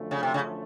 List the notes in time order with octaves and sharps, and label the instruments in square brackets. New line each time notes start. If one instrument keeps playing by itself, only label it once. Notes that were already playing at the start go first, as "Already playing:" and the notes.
Already playing: [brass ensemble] F#2 D3 F3 A3
[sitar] C#3
C3
C#3